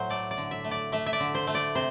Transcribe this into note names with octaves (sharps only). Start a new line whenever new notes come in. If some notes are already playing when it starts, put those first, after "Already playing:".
Already playing: A2 F#3 C5
A3 D5
D5
D3
E5
A3
D5
A3 E5
E5
D5
D3
C5
A3
D5
C3 C5